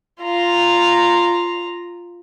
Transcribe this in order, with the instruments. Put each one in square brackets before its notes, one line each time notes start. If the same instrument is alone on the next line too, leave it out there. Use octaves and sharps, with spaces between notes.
[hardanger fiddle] F4 A#5